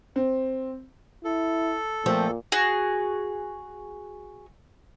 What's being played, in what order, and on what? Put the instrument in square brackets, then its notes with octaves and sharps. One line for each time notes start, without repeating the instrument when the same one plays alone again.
[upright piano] C4
[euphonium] E4 [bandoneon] A4
[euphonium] A#2 [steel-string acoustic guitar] F3 A3 C4
[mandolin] F#4 G#4